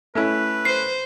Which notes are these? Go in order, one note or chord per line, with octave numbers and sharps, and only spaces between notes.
A3 C#4 E4 B4
C5 C7